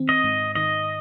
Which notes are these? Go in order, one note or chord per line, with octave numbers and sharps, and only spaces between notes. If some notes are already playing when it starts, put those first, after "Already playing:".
Already playing: D#3 C4
D#5
G#2
D#3 D#5